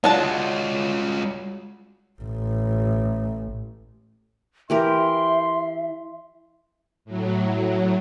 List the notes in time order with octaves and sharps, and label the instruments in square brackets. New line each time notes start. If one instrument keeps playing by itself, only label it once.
[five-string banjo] F#3 D4 A5 [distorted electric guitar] G#3 F4
[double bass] A1
[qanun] E3 G4 A#4 [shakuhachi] E5 [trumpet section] C6
[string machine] A2 F#3